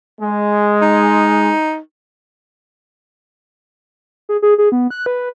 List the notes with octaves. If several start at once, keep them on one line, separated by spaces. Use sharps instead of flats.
G#3
D#4
G#4
G#4
G#4
B3
F#6
B4